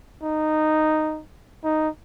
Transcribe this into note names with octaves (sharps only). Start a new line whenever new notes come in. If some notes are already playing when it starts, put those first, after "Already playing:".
D#4
D#4